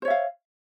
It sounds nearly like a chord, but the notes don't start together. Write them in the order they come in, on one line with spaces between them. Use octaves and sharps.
C5 C#5 E5 F5